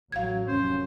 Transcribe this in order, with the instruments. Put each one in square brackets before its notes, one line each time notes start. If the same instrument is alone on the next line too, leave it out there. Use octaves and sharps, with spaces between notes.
[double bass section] A1 F#3 [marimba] F5 G#6
[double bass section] F1 F#2 C#4 [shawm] C5